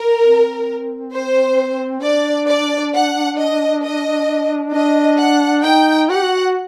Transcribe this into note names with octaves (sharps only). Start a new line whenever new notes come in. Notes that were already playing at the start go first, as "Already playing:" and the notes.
Already playing: A#4
C4
C5
D4 D5
D5
F#5
D#5
D#5
D4 D#5
F#5
D#4 G5
F#4 F#5
G4
F#4